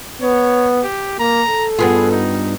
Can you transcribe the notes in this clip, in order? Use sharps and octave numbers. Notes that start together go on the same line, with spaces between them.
B3 C#5
G4
A#3 A#5
A4
G2 B3 F4 G#4
D#4